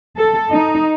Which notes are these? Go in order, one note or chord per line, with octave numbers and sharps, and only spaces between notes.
A4
D#4